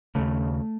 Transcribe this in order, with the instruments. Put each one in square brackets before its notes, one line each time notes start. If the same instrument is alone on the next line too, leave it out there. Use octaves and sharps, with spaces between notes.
[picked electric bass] D#2 C#3 A3